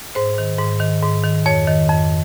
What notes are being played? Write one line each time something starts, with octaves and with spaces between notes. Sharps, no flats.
G#2 C5
D#3
G#2
D#3
G#2
D#3
F2 C#5
D#3
F2